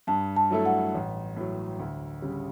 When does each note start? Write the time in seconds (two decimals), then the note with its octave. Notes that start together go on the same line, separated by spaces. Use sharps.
0.07 G2 A5
0.36 A5
0.50 F#3 A3 E4 A4
0.65 F#5
0.94 A1
1.36 A2 F#3
1.79 D2
2.22 C#3 G3